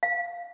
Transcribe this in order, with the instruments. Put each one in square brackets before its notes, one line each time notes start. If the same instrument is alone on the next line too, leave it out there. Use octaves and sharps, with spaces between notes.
[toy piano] F5